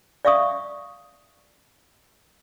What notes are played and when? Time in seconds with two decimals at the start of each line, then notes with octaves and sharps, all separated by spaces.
0.25 D5 E5 F5 C#6 D#6